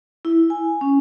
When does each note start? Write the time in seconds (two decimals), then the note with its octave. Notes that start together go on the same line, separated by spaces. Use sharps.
0.25 E4
0.50 G#5
0.81 C#4